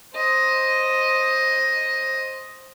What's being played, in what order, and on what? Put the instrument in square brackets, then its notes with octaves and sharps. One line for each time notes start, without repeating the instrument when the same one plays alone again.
[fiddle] C5 D#5